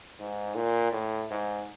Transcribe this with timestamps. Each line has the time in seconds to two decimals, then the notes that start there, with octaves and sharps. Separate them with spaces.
0.19 G#2
0.55 A#2
0.92 A2
1.31 G#2